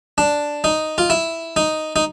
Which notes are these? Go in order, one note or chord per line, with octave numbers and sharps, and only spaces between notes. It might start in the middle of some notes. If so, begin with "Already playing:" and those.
D4
D#4
F4
E4
D#4
D#4